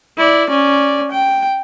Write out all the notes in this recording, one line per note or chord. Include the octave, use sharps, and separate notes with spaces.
E4 D5
C#4 D5
G5